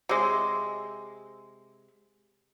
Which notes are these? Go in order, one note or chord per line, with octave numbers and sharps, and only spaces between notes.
C3 G#3